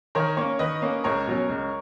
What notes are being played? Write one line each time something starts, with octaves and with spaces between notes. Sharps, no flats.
D#3 A#4 C#5
A#3 C#4 A#4 C#5
D#3 B4 D#5
A#3 C#4
C#2 A#4 C#5
B2 F#3 C#4
C#2